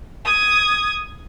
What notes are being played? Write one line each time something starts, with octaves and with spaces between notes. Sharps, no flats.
D#6 G#6